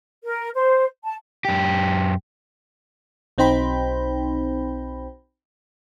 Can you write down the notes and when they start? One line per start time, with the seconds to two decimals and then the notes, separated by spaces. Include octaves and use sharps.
0.24 A#4
0.55 C5
1.03 A5
1.45 F#2 G4
3.38 B1 C4 D#4 C5 G5 B5